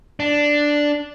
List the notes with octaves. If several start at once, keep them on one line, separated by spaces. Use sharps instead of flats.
D4